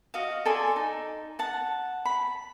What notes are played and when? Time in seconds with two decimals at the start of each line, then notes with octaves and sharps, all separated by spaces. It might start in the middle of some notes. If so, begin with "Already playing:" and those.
0.14 F#4 D#5 F5
0.45 A4 D5 G#5 C6
0.76 D#4
1.39 F#5 A5
2.05 B5